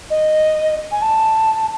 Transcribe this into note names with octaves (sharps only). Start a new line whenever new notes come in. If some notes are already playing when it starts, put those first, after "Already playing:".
D#5
G#5
A5